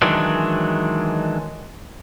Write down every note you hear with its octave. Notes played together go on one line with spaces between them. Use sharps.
D#3 E3 F#3 G#3 D4